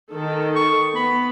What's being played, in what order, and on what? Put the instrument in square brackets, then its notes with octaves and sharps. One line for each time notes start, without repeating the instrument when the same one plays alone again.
[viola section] D#3 A4
[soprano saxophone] C#6
[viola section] B3 [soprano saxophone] B5